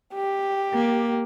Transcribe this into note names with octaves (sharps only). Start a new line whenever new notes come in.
G4
A#3